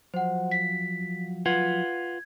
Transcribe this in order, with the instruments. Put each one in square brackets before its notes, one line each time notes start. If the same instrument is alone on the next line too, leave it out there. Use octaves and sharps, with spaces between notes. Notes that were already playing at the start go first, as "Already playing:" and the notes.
[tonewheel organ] F3 F#3 [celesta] C5 F#5
[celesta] B6
[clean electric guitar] F4 B4 F#5 [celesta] G#6